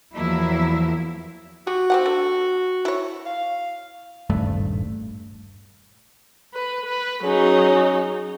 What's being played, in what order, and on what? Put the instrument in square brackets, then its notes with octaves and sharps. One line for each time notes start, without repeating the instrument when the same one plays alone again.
[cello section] E2 F3 F#3 A#3 E4
[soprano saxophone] F#4 [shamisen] G4
[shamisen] C4 G4 F#5
D3
E4 C#5
[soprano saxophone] F5
[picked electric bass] D#1 G#1 G2 A3
[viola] B4
B4
[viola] F#3 D#4 [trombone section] C#4 G#4